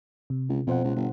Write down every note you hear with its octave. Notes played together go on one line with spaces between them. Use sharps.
C3
C#2
F2 B2 C5 F#5
C#2
G1